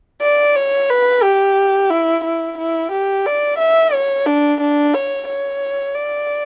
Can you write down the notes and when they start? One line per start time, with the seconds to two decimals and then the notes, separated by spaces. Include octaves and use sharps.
0.21 D5
0.56 C#5
0.89 B4
1.23 G4
1.90 E4
2.24 E4
2.58 E4
2.92 G4
3.26 D5
3.59 E5
3.93 C#5
4.26 D4
4.61 D4
4.94 C#5
5.28 C#5
5.95 D5